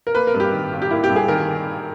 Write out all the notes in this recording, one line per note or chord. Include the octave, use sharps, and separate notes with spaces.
A#4
A#3 B4
A#4
G2
G4
D#3
G#1
G4
A#3 E4
G4
G2
G#4
D#3 A#4